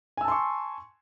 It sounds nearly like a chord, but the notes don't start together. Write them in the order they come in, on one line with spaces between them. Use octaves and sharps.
G#5 E6 A5 C6 C#6